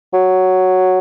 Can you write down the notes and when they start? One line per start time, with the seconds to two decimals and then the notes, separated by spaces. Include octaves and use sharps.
0.14 F#3